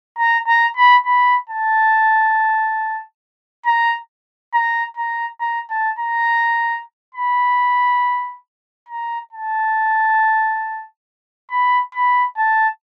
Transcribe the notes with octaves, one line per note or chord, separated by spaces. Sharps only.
A#5
A#5
B5
B5
A5
A#5
A#5
A#5
A#5
A5
A#5
B5
A#5
A5
B5
B5
A5